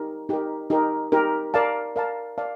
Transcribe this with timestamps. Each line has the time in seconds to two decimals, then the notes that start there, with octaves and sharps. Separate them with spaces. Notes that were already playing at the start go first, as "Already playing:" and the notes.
Already playing: D#4 G4 A#4
0.29 D#4 G4 A#4
0.70 D#4 G4 A#4
1.12 D#4 G4 A#4
1.54 A#4 D5 F5 A5
1.96 A#4 D5 F5 A5
2.38 A#4 D5 F5 A5